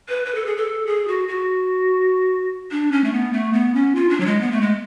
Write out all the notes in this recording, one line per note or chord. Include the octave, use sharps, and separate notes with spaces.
B4
B4
A4
G#4
A4
G#4
F#4
F#4
D4
C#4
A3
B3
A3
B3
C#4
F4
D4
F#3
G#3
B3
A3
G#3